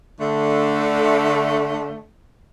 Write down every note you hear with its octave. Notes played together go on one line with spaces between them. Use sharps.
D3 A3